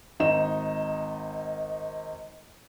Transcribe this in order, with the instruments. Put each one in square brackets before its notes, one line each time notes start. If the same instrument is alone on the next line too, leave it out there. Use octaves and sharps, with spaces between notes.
[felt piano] G#1 D#4 D#5 E7